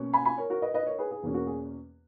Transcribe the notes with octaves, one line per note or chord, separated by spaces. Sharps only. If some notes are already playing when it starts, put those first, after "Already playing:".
Already playing: B2 A#3 C#4
G#5 B5
G#5 B5
A#4 C#5
F#4 A#4
B4 D#5
B4 D#5
A#4 C#5
G#4 B4
G#4
E2 B2 A#3 C#4 G#4
F#4 A#4
G#4